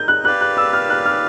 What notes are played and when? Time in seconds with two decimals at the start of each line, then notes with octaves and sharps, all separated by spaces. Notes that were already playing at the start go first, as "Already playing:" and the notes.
Already playing: D#4 A#4 D#5 G6
0.08 F#6
0.25 G4 B4 D5 F5 F#6
0.41 F#6
0.57 E6
0.73 F6
0.90 F#6
1.06 F6